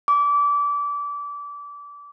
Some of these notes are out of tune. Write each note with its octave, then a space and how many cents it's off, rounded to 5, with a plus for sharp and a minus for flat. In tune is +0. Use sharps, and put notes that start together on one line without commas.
D6 -25